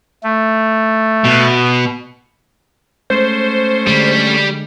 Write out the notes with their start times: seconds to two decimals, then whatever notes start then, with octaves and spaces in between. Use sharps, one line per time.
0.23 A3
1.25 B2
3.10 G#3 A3 C#4 C5
3.87 D3 G3 G#3